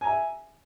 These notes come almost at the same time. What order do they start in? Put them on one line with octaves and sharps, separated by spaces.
G#5 A#5 E5